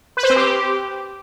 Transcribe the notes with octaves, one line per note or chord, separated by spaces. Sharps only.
B4
C5
C4
G4